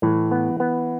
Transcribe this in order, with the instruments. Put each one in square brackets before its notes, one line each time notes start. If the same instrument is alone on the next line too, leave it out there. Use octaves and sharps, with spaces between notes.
[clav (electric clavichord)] A2 [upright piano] E3
[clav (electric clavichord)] B3
B3